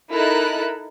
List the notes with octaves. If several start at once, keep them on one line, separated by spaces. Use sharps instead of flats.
D#4 E4 A4 A#4 B5 F#6